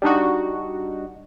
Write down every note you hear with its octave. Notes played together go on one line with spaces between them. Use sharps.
G3 D4 D#4 F#4